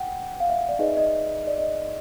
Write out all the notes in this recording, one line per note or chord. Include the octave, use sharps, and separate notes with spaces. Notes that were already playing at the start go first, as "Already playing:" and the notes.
Already playing: F#5 G5
F5
E5
D5
D#4 G#4 B4 D5 D#5
E5
D#5
D5
D#5